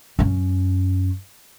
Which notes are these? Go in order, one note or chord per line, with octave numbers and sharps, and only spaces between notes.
F#2 C#4